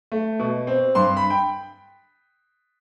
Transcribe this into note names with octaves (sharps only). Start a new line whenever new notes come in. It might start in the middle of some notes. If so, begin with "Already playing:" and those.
A3
B2
C4
G2 C6
B5
G5